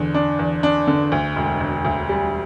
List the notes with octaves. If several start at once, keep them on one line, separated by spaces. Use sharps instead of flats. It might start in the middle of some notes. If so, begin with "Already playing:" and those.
Already playing: E2 D3
D4
E2
D4
D3
D2
E1
E1
D2
G3